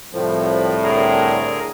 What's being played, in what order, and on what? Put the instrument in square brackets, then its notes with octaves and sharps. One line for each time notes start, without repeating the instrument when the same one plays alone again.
[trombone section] C2 A2 [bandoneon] F3
[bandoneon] D3 G#4 A#4